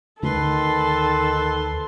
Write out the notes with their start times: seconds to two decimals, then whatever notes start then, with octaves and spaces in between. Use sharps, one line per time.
0.23 D2 D#3 A4 B4 C6